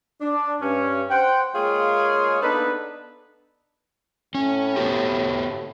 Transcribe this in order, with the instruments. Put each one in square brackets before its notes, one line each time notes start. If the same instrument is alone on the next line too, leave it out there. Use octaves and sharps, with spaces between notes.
[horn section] D4
G2 C#4
C5 F#5 G5
G#3 A#3 F4 G#4 C#5 C6
B3 D4 D#4 A4 B4
[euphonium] A2 [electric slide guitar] C#4
[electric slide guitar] B3 F#4 G4